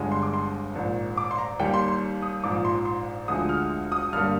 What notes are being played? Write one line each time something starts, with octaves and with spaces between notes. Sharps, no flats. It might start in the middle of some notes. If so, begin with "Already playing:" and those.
Already playing: G1 G2 D3 G#3
C6
D6
C6
A#1 G#2 D#3
D6
C6
A#5
D#2 D#3 G3 G5
C6
C6
D#6
A#1 G#2 F3 D6
C6
C6
D2 D3 F3 G#3 D#6
F6
D#6
G2 D3 G3 A#3 F6